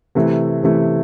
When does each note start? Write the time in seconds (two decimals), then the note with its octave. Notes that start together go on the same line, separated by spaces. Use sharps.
0.15 C3 E3 A3
0.63 C3 E3 A3